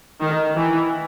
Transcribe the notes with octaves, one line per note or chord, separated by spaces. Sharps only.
D#3
E3